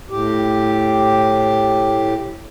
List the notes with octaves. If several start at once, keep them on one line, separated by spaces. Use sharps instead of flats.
A2 G4